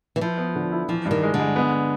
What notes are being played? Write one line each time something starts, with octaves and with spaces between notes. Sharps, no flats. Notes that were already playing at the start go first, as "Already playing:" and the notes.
E3
F3 E4
B3
D3
E4
E3 F3
G2
D#3
G#3
D3
G#3
B3